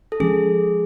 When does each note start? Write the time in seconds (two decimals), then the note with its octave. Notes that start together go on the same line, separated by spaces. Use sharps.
0.12 A4
0.20 F3 G#3 C#4 G#4